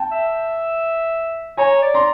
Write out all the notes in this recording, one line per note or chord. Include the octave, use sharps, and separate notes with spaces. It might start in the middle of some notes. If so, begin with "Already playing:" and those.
Already playing: G5 A5
E5
C#5 G#5 A#5
D5
A#5 C6